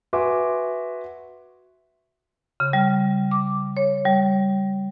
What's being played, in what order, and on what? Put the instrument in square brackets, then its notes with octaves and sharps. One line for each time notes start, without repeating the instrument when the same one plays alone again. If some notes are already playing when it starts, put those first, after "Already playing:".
[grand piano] F#4 B4 E5 G#5 C6 D6
[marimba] C#3
G3
D6
C#5
G3